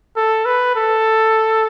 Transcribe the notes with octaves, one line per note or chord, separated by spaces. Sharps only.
A4
B4
A4